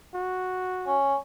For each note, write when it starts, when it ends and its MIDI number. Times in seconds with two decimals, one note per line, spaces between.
0.14 0.99 66
0.86 1.16 61